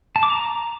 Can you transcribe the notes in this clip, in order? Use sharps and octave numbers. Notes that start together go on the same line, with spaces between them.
A5
D6
A#5